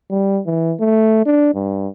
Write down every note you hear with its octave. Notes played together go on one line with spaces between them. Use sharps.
G3
E3
A3
D4
G2